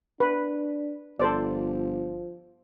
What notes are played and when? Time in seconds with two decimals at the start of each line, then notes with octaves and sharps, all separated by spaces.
0.20 D4 B4
1.19 G1 F3 A4 C5 D5